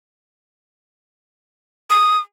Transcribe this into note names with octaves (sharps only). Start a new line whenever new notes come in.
D#6